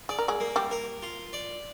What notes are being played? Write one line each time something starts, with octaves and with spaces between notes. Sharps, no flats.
G#4 D5
A#4
G#3 G#4
A#3
G3 G4
A#4
F4
D5